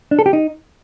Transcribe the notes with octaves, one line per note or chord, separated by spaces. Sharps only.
D4
A4
G4
D#4